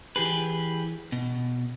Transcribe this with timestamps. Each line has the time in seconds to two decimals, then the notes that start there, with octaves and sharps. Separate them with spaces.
0.16 E3 G4 G#4 B4
1.12 B2